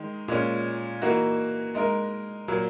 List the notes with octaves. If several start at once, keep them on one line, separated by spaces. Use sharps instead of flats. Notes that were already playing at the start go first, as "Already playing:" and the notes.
Already playing: D#3 G#3 D#4
A#2 G#3 C#4
E3 A#3 D#4 F#4
G#3 D#4 A#4
A#2 F#3 A#3